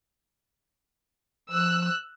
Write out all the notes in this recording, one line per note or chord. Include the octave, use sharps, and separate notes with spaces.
F3 E6 F#6